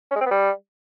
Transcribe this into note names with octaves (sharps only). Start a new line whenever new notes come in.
C#4
G#3
C4
B3
G3